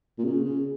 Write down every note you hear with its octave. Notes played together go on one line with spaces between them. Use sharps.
A#2
C#3
C#3